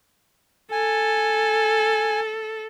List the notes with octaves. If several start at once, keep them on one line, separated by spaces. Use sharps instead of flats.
A4 G#5